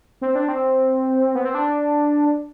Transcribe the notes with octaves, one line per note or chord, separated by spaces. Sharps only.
C4
D4
C4
B3
C4
D4